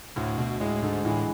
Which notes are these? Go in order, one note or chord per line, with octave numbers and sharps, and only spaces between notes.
D2 A2
D2 B2
A2 G#3
G#2 D3
A2 E3